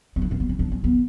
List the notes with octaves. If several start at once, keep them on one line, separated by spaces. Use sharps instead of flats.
C#4
D4
C#4
B3
C#4
D4
C#4
B3